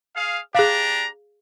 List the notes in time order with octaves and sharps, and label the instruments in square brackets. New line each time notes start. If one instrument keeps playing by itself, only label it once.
[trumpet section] G#4 F5
[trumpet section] D4 G4 A#5 [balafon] G#4 F5